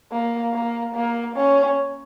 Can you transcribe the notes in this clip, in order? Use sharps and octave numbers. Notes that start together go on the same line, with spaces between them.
A#3
A#3
A#3
C#4